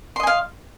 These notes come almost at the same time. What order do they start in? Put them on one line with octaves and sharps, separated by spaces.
C6 D#5 G#5 F5